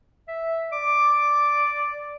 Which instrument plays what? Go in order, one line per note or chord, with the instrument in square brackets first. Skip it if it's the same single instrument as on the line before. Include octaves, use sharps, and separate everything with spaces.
[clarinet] E5
[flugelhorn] D5 [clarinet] D6